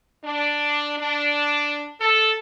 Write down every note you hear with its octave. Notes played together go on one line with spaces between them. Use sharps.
D4
D4
A4